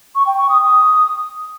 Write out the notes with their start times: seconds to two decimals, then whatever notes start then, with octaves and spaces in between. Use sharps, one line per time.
0.15 C#6
0.27 G5
0.38 C#6
0.49 D#6
0.61 D#6